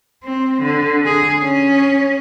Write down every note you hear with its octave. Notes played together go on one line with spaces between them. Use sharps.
C4
D3
G#4
C#4